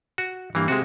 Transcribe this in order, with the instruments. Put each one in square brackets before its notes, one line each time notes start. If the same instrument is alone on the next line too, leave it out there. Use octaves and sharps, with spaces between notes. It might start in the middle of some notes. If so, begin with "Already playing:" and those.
[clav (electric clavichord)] F#4
[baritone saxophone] G2 [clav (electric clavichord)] E3 A#3
[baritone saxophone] C3 [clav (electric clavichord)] G#3 F#4